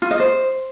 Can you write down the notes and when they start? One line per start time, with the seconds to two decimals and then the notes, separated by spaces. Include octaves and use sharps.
0.02 F4
0.11 D#5
0.20 C5